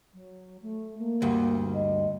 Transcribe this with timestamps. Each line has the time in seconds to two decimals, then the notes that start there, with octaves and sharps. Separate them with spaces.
0.13 F#3
0.62 A3
0.98 A#3
1.22 D2 G2
1.74 D#5